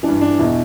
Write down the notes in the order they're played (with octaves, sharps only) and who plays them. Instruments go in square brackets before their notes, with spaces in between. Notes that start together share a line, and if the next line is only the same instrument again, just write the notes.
[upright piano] E3 D4
G2
D4
E2 B2 E4